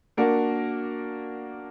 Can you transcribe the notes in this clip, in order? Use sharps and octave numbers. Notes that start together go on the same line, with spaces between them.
A#3 D4 F#4 A#4